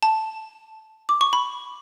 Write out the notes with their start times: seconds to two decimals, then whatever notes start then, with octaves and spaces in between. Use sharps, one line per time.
0.03 A5
1.09 D6
1.21 C#6
1.33 B5